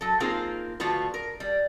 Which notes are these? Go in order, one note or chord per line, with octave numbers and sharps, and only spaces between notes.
F#3 A4
A#3 C4 D#4 F4 G#4 A#4
D3 F3 A3 F4 F#4 B4
A#4
G3